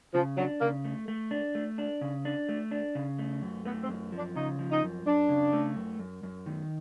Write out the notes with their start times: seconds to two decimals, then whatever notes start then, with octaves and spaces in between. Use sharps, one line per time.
0.14 C#3 F3
0.38 F#3 D4
0.61 C#3 A#3
0.85 A3
1.08 A3
1.31 D4
1.55 A3
1.78 D4
2.01 C#3
2.25 D4
2.49 A3
2.71 D4
2.95 C#3
3.18 A3
3.42 F#2
3.65 A3 B3
3.83 C4
3.89 F#2
4.12 F3
4.18 D4
4.36 C#3 D#4
4.59 F3
4.71 D#4
4.83 F#2
5.06 F#2 D4
5.29 C#3
5.53 A3
5.76 F#2
5.99 F#2
6.23 F#2
6.46 D#3